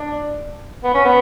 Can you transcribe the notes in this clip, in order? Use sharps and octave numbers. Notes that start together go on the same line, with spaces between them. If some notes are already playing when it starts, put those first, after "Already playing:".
Already playing: D4
B3
C#4
B3